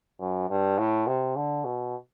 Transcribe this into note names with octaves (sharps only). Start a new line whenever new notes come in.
F#2
G2
A2
C3
D3
B2